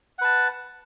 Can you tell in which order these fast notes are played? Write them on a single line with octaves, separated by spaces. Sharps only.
F#5 B4 A5